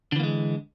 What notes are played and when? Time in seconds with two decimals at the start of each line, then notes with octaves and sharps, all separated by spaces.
0.12 D3
0.16 E3
0.20 A#3
0.23 G#3